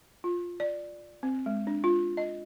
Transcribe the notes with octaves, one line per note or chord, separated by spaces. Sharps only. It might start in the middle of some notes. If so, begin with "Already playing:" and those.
F4
D5
C4
G#3
D4
F4
D#5